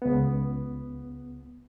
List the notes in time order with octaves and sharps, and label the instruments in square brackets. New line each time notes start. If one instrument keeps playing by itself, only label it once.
[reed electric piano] C#2 B3